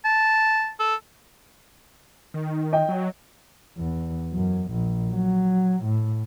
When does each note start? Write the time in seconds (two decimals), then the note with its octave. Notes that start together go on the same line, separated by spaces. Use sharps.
0.05 A5
0.80 A4
2.34 D#3
2.73 D#5 G5
2.89 F#3
3.77 E2
4.33 F#2
4.71 A#1
5.12 F#3
5.83 A2